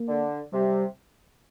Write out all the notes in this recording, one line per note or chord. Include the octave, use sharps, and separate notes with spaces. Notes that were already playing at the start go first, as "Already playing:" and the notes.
Already playing: A#3
D3
C3 G3